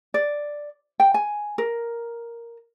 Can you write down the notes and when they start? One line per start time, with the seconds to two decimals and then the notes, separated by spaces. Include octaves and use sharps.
0.14 D5
1.00 G5
1.14 G#5
1.58 A#4